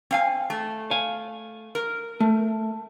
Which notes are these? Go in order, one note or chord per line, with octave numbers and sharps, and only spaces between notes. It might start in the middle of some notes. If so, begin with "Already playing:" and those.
C4 F5 G#5
A3
F5 G#5
A#4
A3